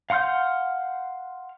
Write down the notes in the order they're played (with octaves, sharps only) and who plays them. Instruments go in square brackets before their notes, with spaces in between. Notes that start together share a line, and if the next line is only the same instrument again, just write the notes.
[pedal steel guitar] F5 F#5 C6 F6 G6